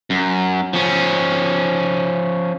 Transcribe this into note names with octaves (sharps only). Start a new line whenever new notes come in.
F#2
F3 C#4